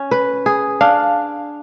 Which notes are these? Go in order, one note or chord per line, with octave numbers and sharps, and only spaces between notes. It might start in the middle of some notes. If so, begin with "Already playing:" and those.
Already playing: C#4
B4
G#4
D4 F5